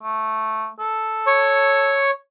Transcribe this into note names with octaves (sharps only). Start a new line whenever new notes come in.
A3
A4
C#5 C#6